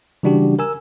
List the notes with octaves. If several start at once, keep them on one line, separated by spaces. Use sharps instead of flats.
C#3 E3 G3 D4 F#4 G4
A#4 G#5 E6